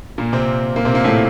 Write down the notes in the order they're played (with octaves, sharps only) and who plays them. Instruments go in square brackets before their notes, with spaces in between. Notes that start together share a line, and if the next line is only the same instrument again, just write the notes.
[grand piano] A#2 A#3
C3 C4
A#2 A#3
C3 C4
A#2 A#3
A2 A3